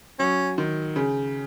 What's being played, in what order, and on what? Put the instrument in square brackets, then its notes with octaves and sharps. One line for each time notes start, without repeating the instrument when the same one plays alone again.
[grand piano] F#3 [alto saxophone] C#4
[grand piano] D#3
C#3